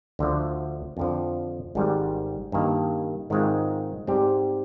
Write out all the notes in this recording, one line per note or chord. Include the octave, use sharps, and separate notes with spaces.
D2 D3 F3
F2 D3 F3
G#1 G#2 G3
G2 D#3 A#3
G#2 D#3 G#3 C4 F4
G#2 G3 C4 G4